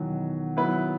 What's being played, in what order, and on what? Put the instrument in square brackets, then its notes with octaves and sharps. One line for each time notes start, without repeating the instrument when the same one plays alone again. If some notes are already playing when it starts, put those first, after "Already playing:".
Already playing: [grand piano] E2 B2 F#3 [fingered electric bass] D#3
[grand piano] F#3 B3 E4 B4